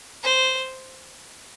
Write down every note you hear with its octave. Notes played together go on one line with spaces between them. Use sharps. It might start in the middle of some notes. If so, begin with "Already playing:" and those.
C5